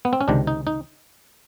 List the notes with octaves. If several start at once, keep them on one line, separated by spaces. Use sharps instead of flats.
B3
C4
C#4
C#2 C3 D#3 D4
D#4
D#4